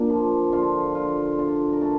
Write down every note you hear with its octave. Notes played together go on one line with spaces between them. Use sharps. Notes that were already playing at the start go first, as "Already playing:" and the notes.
Already playing: A#2 A#3 D4
F3
D3 F4
D3 F4
D4 F4
A#4
A3 A4